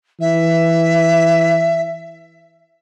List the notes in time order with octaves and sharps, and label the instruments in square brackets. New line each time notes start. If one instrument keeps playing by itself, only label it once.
[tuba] E3 [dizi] E5